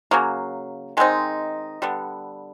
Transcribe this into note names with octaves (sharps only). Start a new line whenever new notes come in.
C#3 F#3 A#3
D#3 G#3 C4 D#4
D3 G3 B3